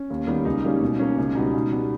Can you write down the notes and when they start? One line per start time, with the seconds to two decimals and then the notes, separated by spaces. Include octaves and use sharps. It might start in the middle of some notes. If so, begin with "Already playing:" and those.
Already playing: C#4
0.10 D#2
0.27 D#3 G3 B3
0.45 C#2 D#4
0.64 C#3 G3 A#3 C#4
0.81 B2
0.99 A#3 C#4
1.18 C#2 C#4
1.35 B2 G3 B3 D#4
1.54 B2
1.72 G3 B3